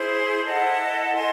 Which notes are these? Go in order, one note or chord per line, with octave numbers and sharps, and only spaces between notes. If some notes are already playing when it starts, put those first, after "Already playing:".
Already playing: E4 G#4 C5
E4 A4 D#5 F#5
A4 D#5 G#5 C6